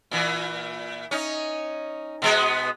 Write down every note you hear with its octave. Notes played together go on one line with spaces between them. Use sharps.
A#2 E3
C#4 D#4
B2 G#3 B3